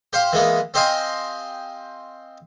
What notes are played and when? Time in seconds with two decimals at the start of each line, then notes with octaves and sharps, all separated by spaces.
0.13 G4 C5 F5
0.33 E3 G#3 A#3 B3
0.74 C4 G4 C5 D#5 F5 G#5